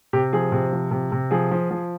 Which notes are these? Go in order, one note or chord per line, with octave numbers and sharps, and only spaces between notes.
C3 G4
F3 G#4
C3
F3
C3
C3
F3 G#4
F3
F3